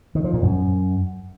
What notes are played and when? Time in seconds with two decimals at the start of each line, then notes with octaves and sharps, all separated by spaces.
0.15 D#3
0.24 F3
0.34 A#2
0.43 F#2